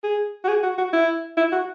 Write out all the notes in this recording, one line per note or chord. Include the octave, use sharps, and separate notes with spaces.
G#4
F#4
G#4
F#4
F#4
E4
E4
F#4